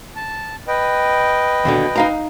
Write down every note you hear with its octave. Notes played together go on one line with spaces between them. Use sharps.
A5
B4 D#5 G5
D#2 B2 D3
D#4 F5 A#5